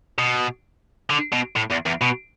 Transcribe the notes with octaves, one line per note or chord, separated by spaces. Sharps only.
B2
D3
B2
A2
E2
E2
B2